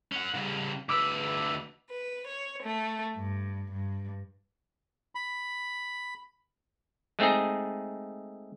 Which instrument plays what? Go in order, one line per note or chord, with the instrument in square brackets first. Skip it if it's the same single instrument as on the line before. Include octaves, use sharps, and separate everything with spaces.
[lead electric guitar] C#4 F#5
C#3 G3
[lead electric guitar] D2 B4 [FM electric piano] D6 E6
[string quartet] B4
C#5
A3
G2
G2
[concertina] B5
[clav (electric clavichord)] G#3 A3 C4 D#4 G#4